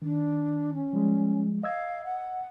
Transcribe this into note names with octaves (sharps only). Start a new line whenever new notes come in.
D#3 D4
C#4
F3 G3 G#3
D#5 F5 E6 G#6
F#5